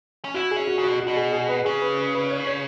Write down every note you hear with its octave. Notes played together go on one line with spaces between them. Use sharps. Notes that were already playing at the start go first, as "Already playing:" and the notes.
C#4
E4 F#4
G#4
C#4
F#4
C#3
B2 F#4
F#4
B2
G#4
G#4
B4
C#3 G#4
B4
B4
B4
C#5
C#5